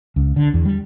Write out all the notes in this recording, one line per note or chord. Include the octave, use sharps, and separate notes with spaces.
C#2
D3
E2
G3